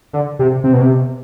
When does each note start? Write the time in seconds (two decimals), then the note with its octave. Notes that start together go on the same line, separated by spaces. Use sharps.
0.13 D3
0.39 C3
0.64 C3
0.73 B2
0.81 C3